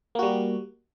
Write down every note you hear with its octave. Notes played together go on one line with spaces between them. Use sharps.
G3 A#3 F#4